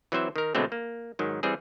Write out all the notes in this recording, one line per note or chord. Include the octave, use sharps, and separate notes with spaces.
E3 F#3 C4 C5 E5
D#3 A#4
B2 D3 F#3 G#3 A3 C4
A#3
G#2 D#3 F#3
E3 G3 C4 G#4